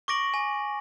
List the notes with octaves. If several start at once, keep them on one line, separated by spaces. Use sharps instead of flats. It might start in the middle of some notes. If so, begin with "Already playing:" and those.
C#6 D6 A#6 D7 F#7
G#5